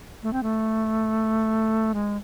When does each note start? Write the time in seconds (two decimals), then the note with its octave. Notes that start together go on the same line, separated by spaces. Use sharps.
0.23 A3
0.33 C4
0.43 A3
1.94 G#3